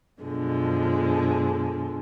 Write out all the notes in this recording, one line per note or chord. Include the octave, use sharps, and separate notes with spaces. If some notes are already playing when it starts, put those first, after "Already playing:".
F#2 B2 D3 F3 G#3